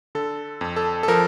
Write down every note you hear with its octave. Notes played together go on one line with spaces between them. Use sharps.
D3 A4
F2
A4
A4
F3 A#4